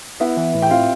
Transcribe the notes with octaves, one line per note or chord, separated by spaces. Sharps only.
B3 E4 E5
E3
A2
G5
C4 F4 F5